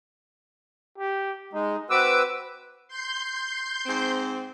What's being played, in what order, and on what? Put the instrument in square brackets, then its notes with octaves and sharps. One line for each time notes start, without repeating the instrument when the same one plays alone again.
[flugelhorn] G4
[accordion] G#3 [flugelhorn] D#4
[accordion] C4 B4 E6 [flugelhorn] F#4 [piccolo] D6
[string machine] C6 G6
[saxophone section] G#2 C4